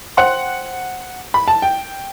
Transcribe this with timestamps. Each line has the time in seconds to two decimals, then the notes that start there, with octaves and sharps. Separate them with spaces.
0.17 C5 F#5 G5 C6
1.34 B5
1.48 A5
1.62 G5